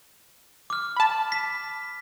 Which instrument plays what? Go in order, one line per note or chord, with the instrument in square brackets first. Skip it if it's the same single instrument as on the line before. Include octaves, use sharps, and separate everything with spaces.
[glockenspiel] D6 F6
[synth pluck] A5 B5
[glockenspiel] B6